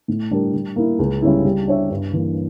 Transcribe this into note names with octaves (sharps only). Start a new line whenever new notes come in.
A2
G3 D4 G4 A#4
G3
A#3 E4
C#2
C#3 G3 C#4 E4
G3
D4 G4 C#5 E5
G2
E3 A#3